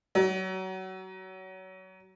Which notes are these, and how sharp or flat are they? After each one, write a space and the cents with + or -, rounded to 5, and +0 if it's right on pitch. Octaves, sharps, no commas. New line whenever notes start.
F#3 +25